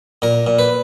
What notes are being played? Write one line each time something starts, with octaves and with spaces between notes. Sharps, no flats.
A#2 A#4
A#2
B4